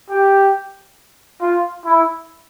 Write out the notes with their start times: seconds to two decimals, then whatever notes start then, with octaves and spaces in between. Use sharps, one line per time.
0.10 G4
1.42 F4
1.86 E4